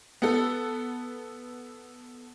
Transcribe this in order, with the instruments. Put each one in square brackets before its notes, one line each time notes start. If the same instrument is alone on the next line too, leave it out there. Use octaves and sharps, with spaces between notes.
[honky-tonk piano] B3 A4